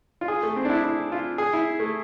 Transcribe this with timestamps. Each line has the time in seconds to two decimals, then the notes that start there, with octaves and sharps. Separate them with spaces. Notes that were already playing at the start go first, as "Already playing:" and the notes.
0.21 F4
0.28 G#4
0.43 A3
0.56 C4
0.65 D4
0.70 E4
0.84 E4
1.12 F4
1.38 G#4
1.53 E4
1.80 A3